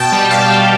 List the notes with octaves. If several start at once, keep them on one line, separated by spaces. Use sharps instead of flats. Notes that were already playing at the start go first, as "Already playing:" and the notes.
Already playing: B2 G5 A5
G3
B2 F5 G5
G3